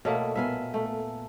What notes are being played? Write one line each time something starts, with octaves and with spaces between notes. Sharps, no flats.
B2 A3 A#3 C#5 F#5
A#2 B3 E5 F5 G#5
A3